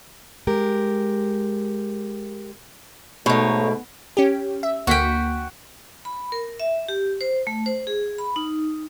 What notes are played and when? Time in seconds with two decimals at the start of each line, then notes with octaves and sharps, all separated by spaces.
0.47 G#3 G4 A#4
3.26 G#2 B2 A3 D#4 A4 C#5
4.17 C#4 G4
4.63 E5
4.87 D2 A#3 F#4 G5 B6
6.05 B5
6.32 A#4
6.60 E5
6.89 G4
7.21 C5
7.47 A3
7.66 C5
7.87 G#4
8.18 B5
8.36 D#4